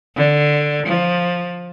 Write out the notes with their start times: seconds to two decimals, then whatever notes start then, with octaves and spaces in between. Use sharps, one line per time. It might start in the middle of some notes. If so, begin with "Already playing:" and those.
0.16 D3
0.86 F3